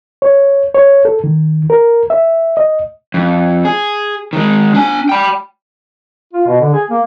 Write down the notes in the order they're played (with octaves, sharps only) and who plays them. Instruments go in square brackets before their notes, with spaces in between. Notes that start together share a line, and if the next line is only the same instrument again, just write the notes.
[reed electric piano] C#5
C#5
A4
D#3
A#4
E5
D#5
[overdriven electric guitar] F2
G#4
D#3 G#3
D4 G#5
G5 B5
[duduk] F4
B2
D3
G#4
A#3